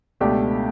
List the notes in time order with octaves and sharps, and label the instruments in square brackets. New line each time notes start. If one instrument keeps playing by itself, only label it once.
[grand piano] C#2 B2 A3 D4 G4